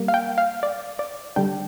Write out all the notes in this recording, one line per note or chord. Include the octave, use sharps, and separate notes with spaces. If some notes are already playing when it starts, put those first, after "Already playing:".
Already playing: G3 A#3
F5
G5
F5
D5
D5
D3 G3 D4 G5